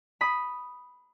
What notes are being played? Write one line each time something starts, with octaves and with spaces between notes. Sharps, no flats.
B5 D#6 B6